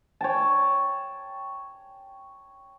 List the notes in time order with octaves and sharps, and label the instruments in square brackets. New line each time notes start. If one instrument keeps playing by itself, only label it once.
[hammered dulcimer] C#5 G5 A5